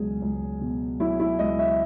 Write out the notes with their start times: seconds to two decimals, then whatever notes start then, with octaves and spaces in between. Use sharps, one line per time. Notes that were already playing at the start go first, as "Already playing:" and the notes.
Already playing: C#2 B2 F#3 G#4
0.22 C#2
0.61 B2
1.00 F#3 E4
1.20 E4
1.39 C#2 D#5
1.59 E5